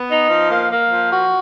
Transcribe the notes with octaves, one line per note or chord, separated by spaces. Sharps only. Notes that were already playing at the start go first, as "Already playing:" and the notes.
Already playing: B3
D#4
F3
A#3
A#3
F3
F#4